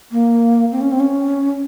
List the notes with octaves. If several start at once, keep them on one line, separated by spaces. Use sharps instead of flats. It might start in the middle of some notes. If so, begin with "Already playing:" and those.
A#3
C4
C#4
C4
C#4